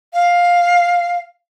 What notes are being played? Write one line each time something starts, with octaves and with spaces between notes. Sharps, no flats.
F5